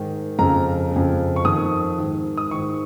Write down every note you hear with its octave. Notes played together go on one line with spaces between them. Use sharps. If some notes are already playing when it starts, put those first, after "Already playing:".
Already playing: G#2 D#3
F2 C#3 A#5
F2 C#3
C#6
F2 D#3 D#6
G#2 D#3
D#6
G#2 D#3 C#6